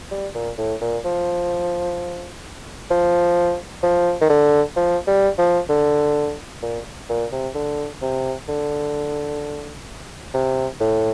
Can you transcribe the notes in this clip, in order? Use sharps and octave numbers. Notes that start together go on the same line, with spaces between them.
G3
A#2
A2
A#2
F3
F3
F3
D#3
D3
F3
G3
F3
D3
A#2
A#2
C3
D3
C3
D3
C3
A2